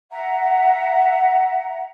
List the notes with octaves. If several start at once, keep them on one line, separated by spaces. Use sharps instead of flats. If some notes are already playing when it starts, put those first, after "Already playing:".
E5 F#5 A#5